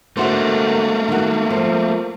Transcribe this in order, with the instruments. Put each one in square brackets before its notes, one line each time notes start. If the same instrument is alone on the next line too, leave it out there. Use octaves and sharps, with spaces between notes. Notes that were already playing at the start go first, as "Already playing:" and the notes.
[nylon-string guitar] D3 F#4 C5 [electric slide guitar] A3 A#3
[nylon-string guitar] D#3 F#4
F3